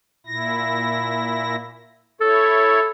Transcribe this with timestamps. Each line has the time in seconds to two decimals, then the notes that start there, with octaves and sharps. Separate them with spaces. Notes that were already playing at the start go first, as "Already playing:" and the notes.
0.26 A#2 E4 A#6
2.21 E4 A4 C#5